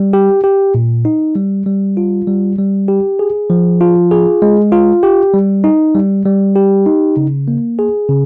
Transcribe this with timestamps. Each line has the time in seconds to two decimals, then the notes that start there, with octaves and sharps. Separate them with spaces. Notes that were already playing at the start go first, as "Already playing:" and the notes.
Already playing: G3
0.13 G4
0.44 G4
0.75 A#2
1.05 D#4
1.36 G3
1.66 G3
1.97 F4
2.27 G3
2.58 G3
2.88 G4
3.19 G#4
3.50 F3
3.81 F4
4.11 G#4
4.42 G#3
4.72 F4
5.03 G4
5.34 G3
5.64 D#4
5.95 G3
6.26 G3
6.56 G4
6.86 D#4
7.17 C#3
7.48 A#3
7.79 G#4
8.09 C#3